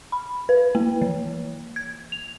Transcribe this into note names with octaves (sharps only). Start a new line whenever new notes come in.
B5
B4
A#3
E3
G#6
F7